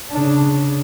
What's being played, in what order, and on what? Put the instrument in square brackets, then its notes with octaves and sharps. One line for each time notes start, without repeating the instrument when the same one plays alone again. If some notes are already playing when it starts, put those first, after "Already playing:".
[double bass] C#3 D4